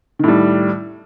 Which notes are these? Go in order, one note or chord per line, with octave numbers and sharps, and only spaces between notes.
A2 D#3 G3